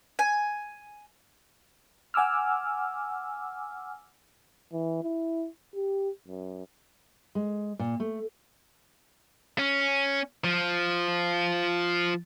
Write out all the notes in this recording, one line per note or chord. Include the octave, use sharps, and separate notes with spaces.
G#5
F#5 G#5 D6 E6 F6
E3
E4
G4
F#2
G#3
A#2
A3
C#4
F3